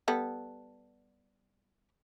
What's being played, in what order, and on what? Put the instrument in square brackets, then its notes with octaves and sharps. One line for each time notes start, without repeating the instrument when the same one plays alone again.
[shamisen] G3 B3 A4